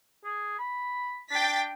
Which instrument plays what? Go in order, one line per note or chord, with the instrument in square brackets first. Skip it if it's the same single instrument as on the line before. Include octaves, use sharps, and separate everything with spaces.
[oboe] G#4
B5
[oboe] D4 [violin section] G5 A6 B6